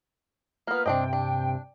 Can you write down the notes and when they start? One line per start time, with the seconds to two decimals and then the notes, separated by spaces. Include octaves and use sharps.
0.67 A#3 B3 F4 B4 F6
0.86 G2 C3 C4 D4 D#5 G5
1.13 D4